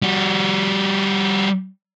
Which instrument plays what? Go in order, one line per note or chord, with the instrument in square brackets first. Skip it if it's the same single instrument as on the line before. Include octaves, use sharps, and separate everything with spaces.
[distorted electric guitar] G3 F#4